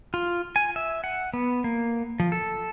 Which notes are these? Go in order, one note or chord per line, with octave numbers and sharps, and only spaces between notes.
F4
G#5
E5
F#5
B3
A#3
F3
A4